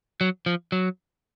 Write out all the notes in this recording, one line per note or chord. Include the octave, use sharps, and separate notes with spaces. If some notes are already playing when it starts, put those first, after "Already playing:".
F#3
F3
F#3